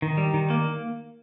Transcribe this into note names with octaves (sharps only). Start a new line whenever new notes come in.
D#3
G3
D#3
A#3